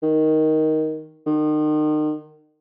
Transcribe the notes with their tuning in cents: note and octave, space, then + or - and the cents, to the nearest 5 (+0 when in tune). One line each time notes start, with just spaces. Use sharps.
D#3 +5
D#3 -35